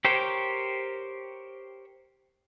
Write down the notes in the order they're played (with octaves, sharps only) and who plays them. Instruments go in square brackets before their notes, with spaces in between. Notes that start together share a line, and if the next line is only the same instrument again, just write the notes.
[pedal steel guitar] G4 A#4 C5 C#5 G5